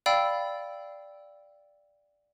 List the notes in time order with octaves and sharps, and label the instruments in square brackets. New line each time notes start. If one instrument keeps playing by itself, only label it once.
[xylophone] D5 F5 G5 B5 E6